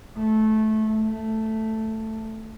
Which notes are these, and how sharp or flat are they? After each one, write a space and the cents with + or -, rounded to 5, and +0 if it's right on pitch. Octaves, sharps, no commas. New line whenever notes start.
A3 -15
A3 +5